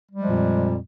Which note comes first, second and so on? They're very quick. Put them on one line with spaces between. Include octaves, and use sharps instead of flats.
G3 G#3 F3 F2 A#2